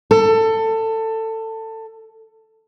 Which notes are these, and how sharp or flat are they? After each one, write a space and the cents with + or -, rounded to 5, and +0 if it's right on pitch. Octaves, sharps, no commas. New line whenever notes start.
A4 +20